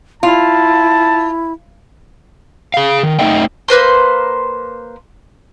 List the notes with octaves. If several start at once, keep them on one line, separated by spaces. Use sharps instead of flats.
E4 F4 A5
G#4 F5
D#3
A3 D#4 A4 D#5 E5 G5
A#3 B4 C5 C6